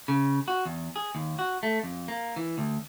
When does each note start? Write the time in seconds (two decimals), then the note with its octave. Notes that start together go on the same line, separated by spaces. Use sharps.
0.08 C#3
0.48 F#4
0.66 E2
0.96 G#4
1.15 D#2
1.39 F#4
1.63 A3
1.83 F2
2.08 A#3
2.36 E3
2.58 D2